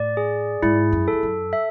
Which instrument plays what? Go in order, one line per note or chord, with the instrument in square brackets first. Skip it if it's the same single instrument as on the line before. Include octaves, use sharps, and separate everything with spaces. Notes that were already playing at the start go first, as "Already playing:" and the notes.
Already playing: [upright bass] A2 [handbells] D5
[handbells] G#4
[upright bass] G#2 [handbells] E4
[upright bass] F#2
[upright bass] E2 [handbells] A4
[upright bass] F#2
[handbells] E5